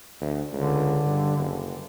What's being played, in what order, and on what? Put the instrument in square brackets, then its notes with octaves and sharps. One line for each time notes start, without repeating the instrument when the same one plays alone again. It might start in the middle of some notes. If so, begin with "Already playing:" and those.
[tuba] D2
[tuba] C#2 [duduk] D3
[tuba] G2
F#1